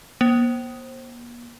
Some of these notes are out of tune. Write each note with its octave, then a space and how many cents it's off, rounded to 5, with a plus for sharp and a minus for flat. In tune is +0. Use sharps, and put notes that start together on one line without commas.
A#3 +45 C5 +20